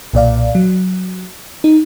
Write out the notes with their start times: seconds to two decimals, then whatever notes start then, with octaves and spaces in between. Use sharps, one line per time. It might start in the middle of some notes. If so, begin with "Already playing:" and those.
0.13 B1 A#2 D5 F5
0.55 F#3
1.64 D#4